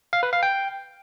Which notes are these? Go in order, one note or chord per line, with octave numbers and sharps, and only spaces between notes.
F5
B4
F5
G5